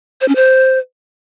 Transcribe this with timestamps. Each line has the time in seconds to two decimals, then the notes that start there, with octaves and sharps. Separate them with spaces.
0.21 C5
0.28 C#4
0.36 C5